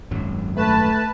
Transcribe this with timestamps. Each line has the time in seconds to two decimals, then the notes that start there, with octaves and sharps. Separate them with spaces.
0.11 G#1 F#2 F#3
0.56 A3 B4 A5